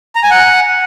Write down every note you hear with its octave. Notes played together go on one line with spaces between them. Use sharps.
A#5
G#5
F#5